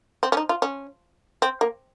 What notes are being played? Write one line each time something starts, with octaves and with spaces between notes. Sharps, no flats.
C4
C#4
D#4
F4
C#4
C4
A#3